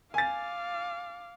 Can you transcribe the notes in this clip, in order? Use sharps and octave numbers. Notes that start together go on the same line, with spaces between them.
F5 G#5 D6 A6